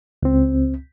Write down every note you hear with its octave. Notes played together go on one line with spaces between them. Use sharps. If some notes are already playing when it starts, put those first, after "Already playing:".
C#2 C4